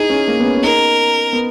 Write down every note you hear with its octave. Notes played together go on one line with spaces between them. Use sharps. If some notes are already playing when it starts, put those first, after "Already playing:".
Already playing: D#4 E4 G#4
C#4
A#3
B3
C#4
C#4
D#4 A#4
B3